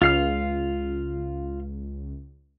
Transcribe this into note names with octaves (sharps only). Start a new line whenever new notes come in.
C#2 F4 F5 F6